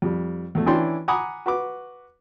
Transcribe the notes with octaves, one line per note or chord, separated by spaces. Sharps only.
F2 G3
E2 A3
E3 C#4 D4 E4 G5 C6
F#5 G#5 A#5 B5 D6 D#6
F#4 B4 D6